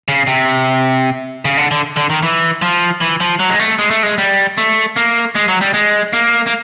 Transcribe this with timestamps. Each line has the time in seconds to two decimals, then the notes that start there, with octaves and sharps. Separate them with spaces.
0.08 C#3
0.27 C3
1.45 C#3
1.57 D3
1.71 D3
1.97 D3
2.10 D#3
2.23 E3
2.62 F3
3.01 E3
3.21 F3
3.40 F#3
3.50 G#3
3.60 A3
3.79 G#3
3.90 A3
4.03 G#3
4.18 G3
4.58 A3
4.96 A#3
5.35 G#3
5.48 F#3
5.61 G3
5.74 G#3
6.13 A#3
6.46 A#3